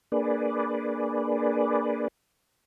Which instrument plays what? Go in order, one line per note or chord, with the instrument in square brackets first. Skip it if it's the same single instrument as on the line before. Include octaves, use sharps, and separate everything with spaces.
[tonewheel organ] A#3 D4 G#4 B4 D5